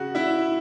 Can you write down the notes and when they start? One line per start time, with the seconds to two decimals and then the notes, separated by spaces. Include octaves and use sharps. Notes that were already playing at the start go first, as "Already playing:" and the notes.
Already playing: C#3 F#4 F#5
0.15 E4 E5